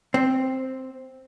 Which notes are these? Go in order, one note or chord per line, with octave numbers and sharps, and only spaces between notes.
C4